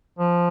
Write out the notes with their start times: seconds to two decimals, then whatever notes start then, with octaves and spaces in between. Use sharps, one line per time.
0.19 F3